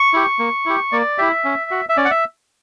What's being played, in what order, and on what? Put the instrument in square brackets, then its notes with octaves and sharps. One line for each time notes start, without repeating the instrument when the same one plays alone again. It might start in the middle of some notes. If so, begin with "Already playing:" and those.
Already playing: [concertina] C#6
E4 G4
A#3
E4 G4
A#3 D5
E4 G4 E5
C#4
F#4
E5
C#4 D5
F#5
E5